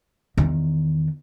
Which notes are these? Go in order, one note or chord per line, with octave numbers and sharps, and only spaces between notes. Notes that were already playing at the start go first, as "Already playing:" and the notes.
E2 D#3